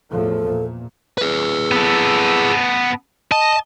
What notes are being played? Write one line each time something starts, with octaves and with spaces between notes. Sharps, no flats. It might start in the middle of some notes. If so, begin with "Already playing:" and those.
E2 A2 F3 A4
A#2
G#4 B4
B3 A4
D#5 A5